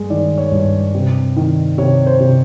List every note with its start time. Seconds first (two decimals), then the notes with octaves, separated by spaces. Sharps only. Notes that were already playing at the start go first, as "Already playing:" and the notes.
Already playing: G2 G#3
0.10 D#3 D5
0.38 C#5
0.52 G2
0.95 C3
1.36 D#3
1.78 C3 C#5
2.06 C5
2.20 C3